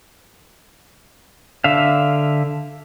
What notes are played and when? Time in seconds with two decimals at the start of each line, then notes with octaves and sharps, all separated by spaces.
1.64 D3 E5 F5